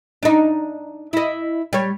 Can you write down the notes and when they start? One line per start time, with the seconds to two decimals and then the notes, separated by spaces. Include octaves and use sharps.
0.23 D4 D#4
1.13 E4 D#5
1.73 G3 C#5